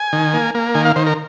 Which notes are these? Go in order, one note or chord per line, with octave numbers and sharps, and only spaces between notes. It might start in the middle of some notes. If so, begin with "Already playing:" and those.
Already playing: G#5
D#3
A#3
A#3
D#3 G#5
F5
D#3 C5
A#4